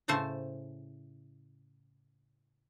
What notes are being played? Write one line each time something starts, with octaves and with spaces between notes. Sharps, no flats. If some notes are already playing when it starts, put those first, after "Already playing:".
A2 C#3 A3 C5 A5